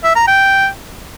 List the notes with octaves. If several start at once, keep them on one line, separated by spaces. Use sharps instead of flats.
E5
A#5
G5